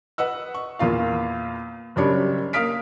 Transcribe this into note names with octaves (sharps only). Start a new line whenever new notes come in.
B4 D#5 F#5 E6
C#6
E2 A#2 F4 F5
F#1 F#2 G3 D4 C#5 B5
A#3 F5 D#6 F6 B6 D7